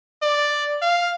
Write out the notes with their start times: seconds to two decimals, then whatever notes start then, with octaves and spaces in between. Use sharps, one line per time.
0.22 D5
0.82 F5